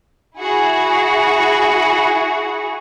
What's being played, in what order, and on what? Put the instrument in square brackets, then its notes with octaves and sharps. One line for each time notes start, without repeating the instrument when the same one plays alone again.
[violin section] E4 F#4 G#4